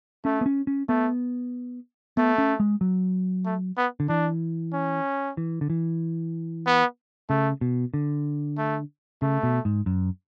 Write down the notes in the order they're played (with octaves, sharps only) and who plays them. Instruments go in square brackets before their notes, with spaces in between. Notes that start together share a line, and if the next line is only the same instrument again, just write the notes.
[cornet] A3 [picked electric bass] C#4
[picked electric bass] B3
C#4
C#4
[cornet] A3 [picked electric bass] B3
[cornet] A3 [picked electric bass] B3
[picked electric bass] C#4
G#3
F#3
[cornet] A3
B3
[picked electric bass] D3
[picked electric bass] E3 [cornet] D4
[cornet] C#4
[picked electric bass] E3
D3
E3
[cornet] B3
[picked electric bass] C#3 [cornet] A3
[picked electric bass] B2
D3
[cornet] A3
[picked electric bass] C#3 [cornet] A3
[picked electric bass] B2
G#2
F#2